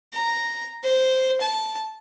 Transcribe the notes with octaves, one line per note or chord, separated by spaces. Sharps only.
A#5
C5
A5